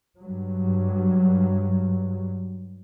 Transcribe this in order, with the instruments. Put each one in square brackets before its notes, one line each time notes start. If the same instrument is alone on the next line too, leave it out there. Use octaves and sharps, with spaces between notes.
[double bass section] G2 F#3